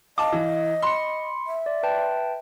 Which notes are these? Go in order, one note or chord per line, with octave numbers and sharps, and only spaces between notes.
D#5 F5 A5 D6
E3
B5 C6 C#7
E5
D5
B4 G5 A5